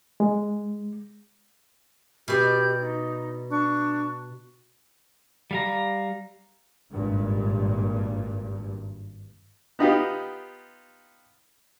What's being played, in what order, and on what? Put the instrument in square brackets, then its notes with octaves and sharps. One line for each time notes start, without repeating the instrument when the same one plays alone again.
[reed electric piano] G#3
[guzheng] B2 D5 [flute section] G4 G6
[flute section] D#4
D4 C#6
[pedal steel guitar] G3 F5 A#5
[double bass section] G#1 G2 A#2
[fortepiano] B3 D#4 F4 G4